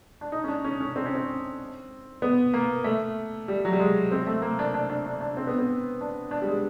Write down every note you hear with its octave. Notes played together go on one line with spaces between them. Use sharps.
D4
D#4
C#4
D4
C#4
C#4
C4
C#4
C4
B3
A#3
A3
G3
F#3
G3
G#3
C4
A3
A#3
D4
D4
D4
D4
D4
C4
B3
C4
D4
D4
G3
G#3